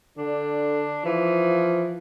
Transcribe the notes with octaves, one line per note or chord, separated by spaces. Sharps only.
D3 D4
E3 F3